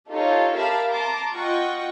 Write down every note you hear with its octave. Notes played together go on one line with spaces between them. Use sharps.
D#4 F4 G4 A4 C#5
G4 A#4 E5 F5 A5 B5
A5 A#5 C6 D6
F4 D#5 F#5 G5 C#6